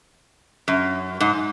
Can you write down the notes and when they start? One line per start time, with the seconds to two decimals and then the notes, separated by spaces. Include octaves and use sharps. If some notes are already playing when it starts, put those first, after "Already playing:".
0.68 F#2
1.20 G#2